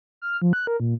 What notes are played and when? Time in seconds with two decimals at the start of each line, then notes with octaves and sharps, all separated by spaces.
0.22 F6
0.42 F3
0.53 F#6
0.67 A#4
0.80 A#2